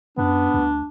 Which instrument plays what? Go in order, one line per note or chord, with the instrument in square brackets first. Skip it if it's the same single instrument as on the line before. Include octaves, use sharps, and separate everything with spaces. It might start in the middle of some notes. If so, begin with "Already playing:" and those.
[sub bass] F#2 [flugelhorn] B3 [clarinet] D4
[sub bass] D2